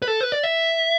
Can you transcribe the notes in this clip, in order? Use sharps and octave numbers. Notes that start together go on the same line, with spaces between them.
B4
A4
B4
D5
E5